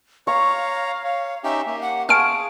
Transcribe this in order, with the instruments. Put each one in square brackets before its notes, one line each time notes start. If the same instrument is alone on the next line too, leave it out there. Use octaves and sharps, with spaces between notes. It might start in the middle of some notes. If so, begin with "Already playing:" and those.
[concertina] C#5 A#5 [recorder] F5 [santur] C#6
[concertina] C#5
[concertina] C#4 D#4 G4 [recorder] E5
[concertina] A#3 G4
[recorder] F#5
[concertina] G#4 [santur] F5 G#5 C#6 [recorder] A5 [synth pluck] F6 D7